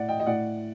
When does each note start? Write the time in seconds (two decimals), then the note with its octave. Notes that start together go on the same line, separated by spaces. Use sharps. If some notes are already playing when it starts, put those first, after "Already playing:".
Already playing: A2 D5 F#5
0.08 D#5 G5
0.20 D#5
0.26 A2 D5 F#5